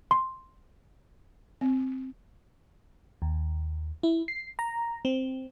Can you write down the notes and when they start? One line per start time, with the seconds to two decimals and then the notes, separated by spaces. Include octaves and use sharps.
0.11 C6
1.61 C4
3.22 D#2
4.03 E4
4.28 C7
4.59 A#5
5.05 C4